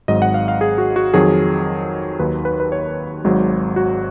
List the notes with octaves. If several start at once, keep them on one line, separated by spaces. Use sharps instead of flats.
G#1 G#2 F#3 D#5
F#5
F5
F5
G#4
F#4
F#4
F2 D#3 F#3 G#4
D#2 D#3 F#3 B4
B4
B4
C#5
G#1 G#2 F#3
F#4